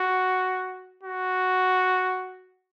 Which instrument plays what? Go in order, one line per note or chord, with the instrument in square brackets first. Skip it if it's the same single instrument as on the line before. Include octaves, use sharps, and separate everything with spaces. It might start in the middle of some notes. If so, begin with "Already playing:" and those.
Already playing: [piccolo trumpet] F#4
F#4